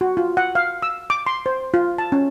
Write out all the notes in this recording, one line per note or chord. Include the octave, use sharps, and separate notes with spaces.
F#4
F4
F#5
F5
E6
D6
C6
C5
F4
A5
C#4